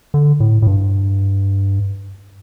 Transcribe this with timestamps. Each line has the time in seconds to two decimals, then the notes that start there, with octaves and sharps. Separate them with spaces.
0.14 D3
0.40 A2
0.62 A2
0.67 G2